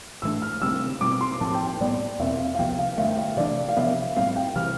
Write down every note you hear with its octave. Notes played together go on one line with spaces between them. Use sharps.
A2 E3 A3 D4 E6
F6
D2 C3 G3 C4 E6
B2 G3 C4 D6
C6
A2 F3 C4 A5
G5
G5
A2 G3 B3 D5
E2 B2 A3 C4 E5
F5
F5
C2 C3 F3 B3 G5
F5
G2 D3 A3 E5
G5
F5
C3 E3 A3 D4 D5
F5
C3 F3 B3 E5
A2 G3 C4 F5
G5
C3 E3 G3 F6